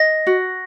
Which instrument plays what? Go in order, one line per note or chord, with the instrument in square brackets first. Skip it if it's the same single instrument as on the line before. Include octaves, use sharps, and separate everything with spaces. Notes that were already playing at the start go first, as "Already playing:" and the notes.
Already playing: [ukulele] D#5 [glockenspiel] A#6
[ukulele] F#4